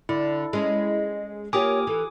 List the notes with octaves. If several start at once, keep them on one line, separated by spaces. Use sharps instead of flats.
D3 E4
G#3 C#4 D#5
A#3 F4 G4 C#5 G#5 D6 D#6
E3 A4